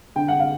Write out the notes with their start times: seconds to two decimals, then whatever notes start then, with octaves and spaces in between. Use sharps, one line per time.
0.16 D3 G5
0.28 F#5
0.39 F5